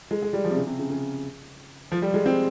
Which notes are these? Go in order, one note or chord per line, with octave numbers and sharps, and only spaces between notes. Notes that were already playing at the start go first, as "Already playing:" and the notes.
G#3
G#3
G3
F3
C3
C#3
C3
C#3
C#3
F3
G3
G#3
C4